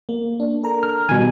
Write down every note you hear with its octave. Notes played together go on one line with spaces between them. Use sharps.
A#3
D4
A4 A#4 A#5
F6
B2 D#3 G3 G#5